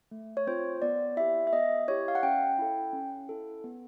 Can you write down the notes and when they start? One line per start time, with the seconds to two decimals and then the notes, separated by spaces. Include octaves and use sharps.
0.11 A3
0.37 C#5
0.47 C4 F4 C5
0.82 B3 D5
1.17 E4 G4 E5
1.47 E5
1.53 B3 D#5
1.88 E4 G4 C#5
2.08 F5
2.15 F#5
2.23 C#4 G5
2.58 E4 A4
2.93 C#4
3.29 E4 A4
3.64 B3